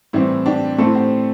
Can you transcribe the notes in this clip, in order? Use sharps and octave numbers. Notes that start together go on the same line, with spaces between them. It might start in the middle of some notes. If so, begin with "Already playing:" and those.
A2 E3 G3 C4 E4
D4 G4
A2 A3 C4 E4 A4
G4 C5